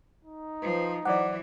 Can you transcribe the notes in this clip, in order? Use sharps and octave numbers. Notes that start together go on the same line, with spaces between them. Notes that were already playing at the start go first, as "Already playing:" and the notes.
D#4
F3 B4 C5
E3 F#3 C5 D5 F#5 D6